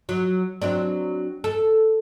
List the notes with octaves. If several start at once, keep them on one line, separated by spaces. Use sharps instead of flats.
F#3
F#3 C4 D4
A4